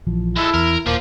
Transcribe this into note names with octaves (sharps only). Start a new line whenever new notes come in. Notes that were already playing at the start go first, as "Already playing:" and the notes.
A#1 E3 F3
G#3 E4 A4
E2 A#4
D#1 F3 A#3 F4